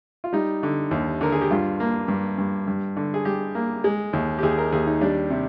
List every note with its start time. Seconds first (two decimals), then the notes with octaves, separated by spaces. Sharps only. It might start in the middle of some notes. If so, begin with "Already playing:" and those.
0.24 F4
0.33 G3 D#4
0.63 D3
0.91 D#2
1.21 D3 A#4
1.32 G#4
1.41 G4
1.51 G2 F4
1.80 A#3
2.08 G2
2.38 G2
2.67 G2
2.97 D3
3.14 G#4
3.25 G3 G4
3.55 A#3
3.84 G#3
4.13 D#2
4.39 G4
4.43 D#2 G#4
4.58 A#4
4.72 D#2 G#4
4.87 D#4
5.01 G3 D4
5.30 C3